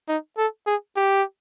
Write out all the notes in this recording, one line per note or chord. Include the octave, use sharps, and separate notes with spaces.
D#4
A4
G#4
G4